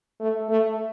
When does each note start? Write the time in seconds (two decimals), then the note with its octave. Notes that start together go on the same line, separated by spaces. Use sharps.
0.20 A3
0.50 A3